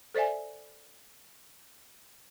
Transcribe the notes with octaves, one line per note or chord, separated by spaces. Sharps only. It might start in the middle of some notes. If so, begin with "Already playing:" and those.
A4 C5 D5 E5 G#5